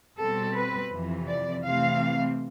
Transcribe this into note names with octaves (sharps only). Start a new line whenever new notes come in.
B2 G3 C4 A4
B4
F2 C3 E3
D5
C3 E3 A3 C4 F5